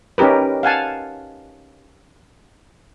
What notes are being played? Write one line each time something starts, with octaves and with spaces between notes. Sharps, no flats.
C#4 D#4 G4 A#4 B4
F5 F#5 G#5 A5